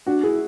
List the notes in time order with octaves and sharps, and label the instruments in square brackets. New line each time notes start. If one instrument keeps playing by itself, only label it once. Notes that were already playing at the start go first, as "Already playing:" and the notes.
[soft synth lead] D4 [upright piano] F#4
[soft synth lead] E4 [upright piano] G#4